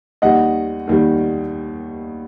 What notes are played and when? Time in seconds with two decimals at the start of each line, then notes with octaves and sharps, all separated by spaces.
0.22 D#2 D#3 G3 D#5 F#5
0.87 D#2 D#3 G3